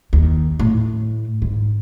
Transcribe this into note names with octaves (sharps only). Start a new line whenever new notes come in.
D#2
A2
G#2